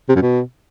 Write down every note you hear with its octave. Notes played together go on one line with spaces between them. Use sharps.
C3
F#2
B2